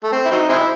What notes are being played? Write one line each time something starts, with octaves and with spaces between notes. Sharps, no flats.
A3
C4
E4
F#3 C4 D#4
G#3 C4 E4